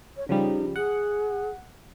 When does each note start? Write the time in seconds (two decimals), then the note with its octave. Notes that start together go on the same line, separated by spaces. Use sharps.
0.16 C#5
0.29 C#3 F3 G3 D#4
0.76 G#4 F#5